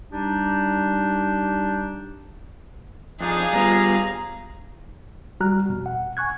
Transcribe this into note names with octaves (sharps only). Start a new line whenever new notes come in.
G3 D4 D#4 G4
F2 D4 D#4 G#4 F5
G3 B3 F4 A#5
G3 F#4 A#5 F6 F#6
F2 B2
F#5
G#5 C#6 F#6 G#6